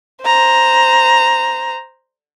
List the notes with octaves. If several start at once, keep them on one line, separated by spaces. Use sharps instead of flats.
C5 A#5